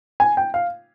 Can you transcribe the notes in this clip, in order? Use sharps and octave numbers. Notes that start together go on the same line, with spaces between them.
G#5
G5
F5